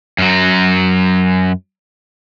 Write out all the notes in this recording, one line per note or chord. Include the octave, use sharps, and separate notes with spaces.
F#2 F#3